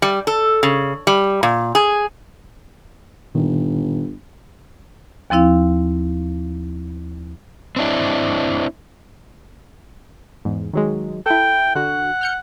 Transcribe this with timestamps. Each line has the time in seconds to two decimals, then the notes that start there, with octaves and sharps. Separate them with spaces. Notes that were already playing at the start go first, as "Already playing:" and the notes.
0.02 G3
0.27 A4
0.63 C#3
1.07 G3
1.43 A#2
1.75 G#4
3.35 G1 A#2 D#3
5.30 D#2 F3 C4 E4 F5
7.76 C4 D4 E4
10.45 E2 G#2
10.73 D#3 F#3 G#3
11.26 E4 A4 G5
11.75 D3 F#4 F#5
12.21 F6 G6 C#7